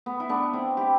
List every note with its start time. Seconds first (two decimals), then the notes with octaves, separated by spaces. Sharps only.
0.06 B3
0.20 E4
0.29 B3 D4
0.53 C4 E4
0.77 E4 G4